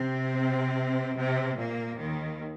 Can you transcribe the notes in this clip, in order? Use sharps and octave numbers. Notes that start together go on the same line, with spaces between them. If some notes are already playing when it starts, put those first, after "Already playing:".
Already playing: C3 C4
C3 C4
A#2 A#3
D#2 D#3